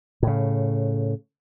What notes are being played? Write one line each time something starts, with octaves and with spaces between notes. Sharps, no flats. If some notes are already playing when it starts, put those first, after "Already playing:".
A2 C#3